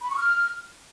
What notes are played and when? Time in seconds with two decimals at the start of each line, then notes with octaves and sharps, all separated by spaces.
0.02 B5
0.10 C#6
0.18 F6